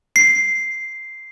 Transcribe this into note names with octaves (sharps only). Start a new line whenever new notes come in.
C7